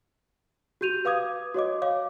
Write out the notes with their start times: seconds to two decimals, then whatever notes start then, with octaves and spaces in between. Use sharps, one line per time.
0.81 F#4 G4 G6 D#7 F7
1.05 B4 F5 D6 D#6 G#6
1.54 F#4 C#5 D#5 D6
1.82 C#5 F5 D6